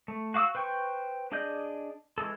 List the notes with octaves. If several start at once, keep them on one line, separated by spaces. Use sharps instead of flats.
A3
F#4 F5 D6 E6
B4 C5 G5 C#6
D4 G#4 D5 D#5 G6
E3 G#3 G#4 A4